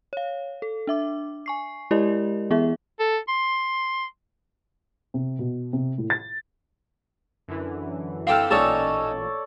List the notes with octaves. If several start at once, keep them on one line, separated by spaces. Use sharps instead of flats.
C#5 F5
A4
D4 E5 D6
G#5 C#6 C7
G#3 E4 G4 A#4 D5 D#5
E3 B3 E4 G#4 E5
A4
C6
C3
B2
C3
A2
A6
F#2 D3 E3
C4 G4 A4 F5 G5 F6
A1 A#2 C#4 D#4 A4 C#5 D5 A5